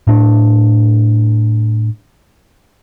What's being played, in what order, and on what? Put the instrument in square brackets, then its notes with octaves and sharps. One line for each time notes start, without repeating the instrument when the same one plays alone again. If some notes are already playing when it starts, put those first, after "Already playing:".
[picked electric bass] A2 D4